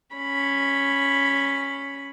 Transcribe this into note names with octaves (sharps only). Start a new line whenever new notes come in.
C#4 B5